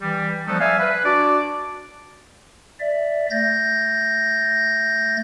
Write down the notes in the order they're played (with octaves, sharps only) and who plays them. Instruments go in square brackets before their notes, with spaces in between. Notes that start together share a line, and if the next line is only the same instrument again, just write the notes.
[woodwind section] E3 G3
F3 G3 A3 B3 D#4
D5 E5 F5 G#5
B4
D4 F#4 D5 A5 D6
[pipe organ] D5 E5
A3 G6 A6 A#6